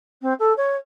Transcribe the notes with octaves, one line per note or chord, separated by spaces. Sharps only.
C4
A4
C#5